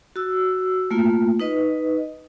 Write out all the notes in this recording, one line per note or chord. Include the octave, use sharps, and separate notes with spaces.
F#4 E6
A3 A#3 F4
D#4 B4 D#5